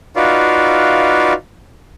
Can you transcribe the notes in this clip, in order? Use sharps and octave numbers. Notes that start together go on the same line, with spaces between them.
D#4 F4 F#4 B4 D5 F5